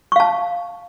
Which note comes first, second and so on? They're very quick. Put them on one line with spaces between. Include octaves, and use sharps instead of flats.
C#6 F5 A5